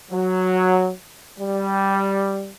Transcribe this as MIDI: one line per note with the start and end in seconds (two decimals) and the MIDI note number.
0.11 0.91 54
1.39 2.51 55